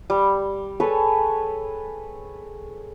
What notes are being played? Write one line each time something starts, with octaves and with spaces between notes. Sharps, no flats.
G3
G#4 A4 B4 C#5